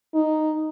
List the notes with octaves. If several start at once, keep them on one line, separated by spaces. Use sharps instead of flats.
D#4